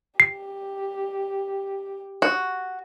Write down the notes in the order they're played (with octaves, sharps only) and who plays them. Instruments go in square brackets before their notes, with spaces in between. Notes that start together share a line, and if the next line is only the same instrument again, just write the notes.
[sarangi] G4 [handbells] C7
[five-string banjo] F#4